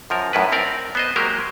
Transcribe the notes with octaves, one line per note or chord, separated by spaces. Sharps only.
F#2 F3 A#4
F#2 A2 E4 F4 B4
C4 A#4 D5
B3 C5 D#5
F#3 G#3 A#3 G4 A#4 C5